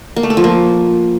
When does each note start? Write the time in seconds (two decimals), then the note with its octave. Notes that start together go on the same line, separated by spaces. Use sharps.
0.16 A#3
0.23 A3
0.30 A4
0.37 F3
0.44 A#3